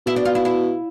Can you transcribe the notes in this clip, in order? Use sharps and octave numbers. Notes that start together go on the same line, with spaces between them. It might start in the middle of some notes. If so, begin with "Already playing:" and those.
B2 E4
D4
F4
E4
E4